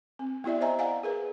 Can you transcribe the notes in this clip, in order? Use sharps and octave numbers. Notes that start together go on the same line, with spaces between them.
C4
B3 E4 G4 D5 E5
C5 D#5 E5 G#5 A#5
D5 F5 F#5 G#5 A#5
G#4 A#4 B4